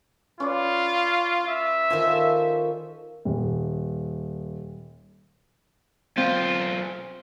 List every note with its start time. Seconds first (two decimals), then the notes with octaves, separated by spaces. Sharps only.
0.40 C#4 F4 B4 D5
1.48 E5
1.90 D#3 F3 A4 G#5
3.25 D#1
6.17 B1 C4 F4